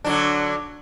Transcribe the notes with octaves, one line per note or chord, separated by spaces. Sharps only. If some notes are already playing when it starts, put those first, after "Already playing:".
D3 F#3 D4